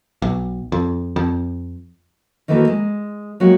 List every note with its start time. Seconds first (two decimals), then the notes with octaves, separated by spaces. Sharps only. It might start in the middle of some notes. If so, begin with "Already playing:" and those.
0.22 B1
0.72 F2
1.16 F2
2.48 D#3 E3 A3 A#3 F#4 A#4
2.68 G#3
3.40 F#3 G#3 A#3 F#4 G4